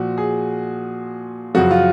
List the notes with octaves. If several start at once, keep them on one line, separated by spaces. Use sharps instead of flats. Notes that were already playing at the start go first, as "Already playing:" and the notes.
Already playing: A#2 F3 F#4
G#4
F#2 C#3 F3 F#4
F4